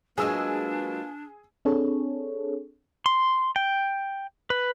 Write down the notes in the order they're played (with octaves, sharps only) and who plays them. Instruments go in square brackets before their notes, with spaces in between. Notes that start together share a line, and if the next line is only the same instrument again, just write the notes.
[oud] F#3 G#3 [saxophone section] A#3 F4 B4 [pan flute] D4 [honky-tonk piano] G#4 E6
[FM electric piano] C4 D4 G#4 A4 C#5
[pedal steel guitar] C6
G5
B4